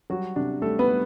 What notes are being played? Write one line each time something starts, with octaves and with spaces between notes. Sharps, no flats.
F#3 G3 F#4
C3 D4
G3 A3 A4
B3 B4
G3